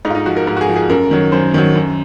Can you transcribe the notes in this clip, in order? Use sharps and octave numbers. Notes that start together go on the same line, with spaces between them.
G#2 D#4
F4
D#4
F3 F#4
A#4
G#2 A#4
F#4
G#4
F3
G#4
F#2 A#4
D#3 F#3
F#2 C5
D#3 F#3
F#2